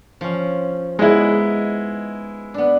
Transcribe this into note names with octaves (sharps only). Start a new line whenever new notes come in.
F3 C#4
G#3 B3 D#4 E4
B3 D4